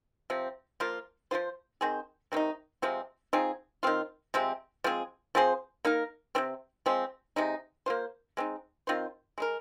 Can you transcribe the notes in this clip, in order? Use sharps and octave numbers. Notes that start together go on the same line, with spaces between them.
C3 F3 C4
F3 A#3 F4
F3 A#3 F4 C5
D#3 C4 G#4 C5
C3 D#3 C4 D#4
C3 F3 G#3 C4
F3 C4 D#4 G#4
D#3 C4 F4
C3 F3 G#3 C4
F3 G#3 C4 G#4
F3 C4 G#4 C5
A#3 D#4 A#4
C3 F3 C4
F3 G#3 C4
C3 G#3 D#4
A#3 F4 C5
G#3 C4 D#4
D#3 C4 F4 C5
G#3 D#4 A#4